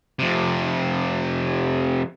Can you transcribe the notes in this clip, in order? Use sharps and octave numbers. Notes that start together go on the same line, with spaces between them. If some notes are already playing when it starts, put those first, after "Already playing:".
F2 C3